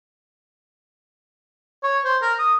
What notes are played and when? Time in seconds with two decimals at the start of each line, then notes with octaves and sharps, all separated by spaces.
1.83 C#5
2.04 C5
2.22 A#4
2.39 D#6